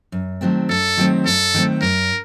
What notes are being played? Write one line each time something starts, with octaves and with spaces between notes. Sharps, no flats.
F#2
D#3 F#3 A3 C4
F#2 A4
D#3 F#3 A3 C4
F#2 A4
D#3 F#3 A3 C4
F#2 A#4